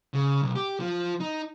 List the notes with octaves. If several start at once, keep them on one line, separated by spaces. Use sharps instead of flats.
C#3
B1
G4
F3
D#4